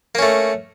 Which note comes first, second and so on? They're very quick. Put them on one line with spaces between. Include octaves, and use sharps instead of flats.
A#3 C#4 A3